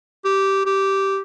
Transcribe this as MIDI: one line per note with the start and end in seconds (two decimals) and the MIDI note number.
0.25 0.65 67
0.66 1.20 67